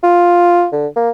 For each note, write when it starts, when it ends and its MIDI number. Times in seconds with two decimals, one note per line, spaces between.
0.03 0.67 65
0.72 0.87 50
0.96 1.10 58